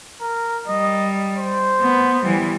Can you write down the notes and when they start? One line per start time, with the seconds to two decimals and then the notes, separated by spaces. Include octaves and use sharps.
0.21 A#4
0.68 G3 D#5
1.38 C5
1.81 B3
2.24 E3 G3